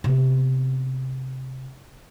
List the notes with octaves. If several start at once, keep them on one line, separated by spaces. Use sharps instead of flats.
C3 B3